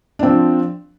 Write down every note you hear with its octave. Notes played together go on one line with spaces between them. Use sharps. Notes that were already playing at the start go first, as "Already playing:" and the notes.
F3 C4 D4